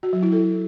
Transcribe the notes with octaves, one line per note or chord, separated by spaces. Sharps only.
F#4
F#3
E4
A4